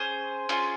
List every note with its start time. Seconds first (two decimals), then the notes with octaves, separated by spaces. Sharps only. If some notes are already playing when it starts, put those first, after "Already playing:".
Already playing: C#4 G#4 C5
0.49 C#4 F4 G#4